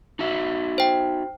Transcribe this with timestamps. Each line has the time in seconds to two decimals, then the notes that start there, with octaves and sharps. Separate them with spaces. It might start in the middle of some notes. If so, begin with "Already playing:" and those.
0.19 D#4 F#4 E5
0.78 C5 G5